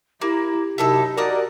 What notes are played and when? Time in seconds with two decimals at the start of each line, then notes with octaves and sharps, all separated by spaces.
0.21 A#3 E4 G4
0.78 F#2 C3 D#4 E4 A4 E6
1.17 A#3 F#4 A#4 D5 D#5 D#6